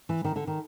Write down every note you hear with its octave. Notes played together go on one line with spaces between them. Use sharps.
E3
D#3
D3
D#3